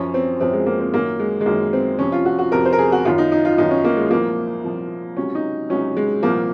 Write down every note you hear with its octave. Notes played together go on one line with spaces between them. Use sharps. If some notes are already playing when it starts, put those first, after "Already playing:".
Already playing: F#2 F3 C#4
C4
F#2 F3 C4
G#3
A#3
C4
F#2 D#3 F#3 A#3
G#3
G#3
F#2 D#3 F#3 A#3
C4
F2 C3 F3 C#4
F4
F#4
F#4
F2 C3 F3 A#4
C5
A#4
G#4
F#4
F#2 D#3 F#3 F4
D#4
D#4
F4
F#2 D#3 F#3 D#4
C#4
A#3
G#3
C2 A#2 F3 A#3
C2 A#2 F3
C#2 C3 F#3 C#4
D#4
C#2 C3 F#3 C#4
G#3
C2 A#2 F3 A#3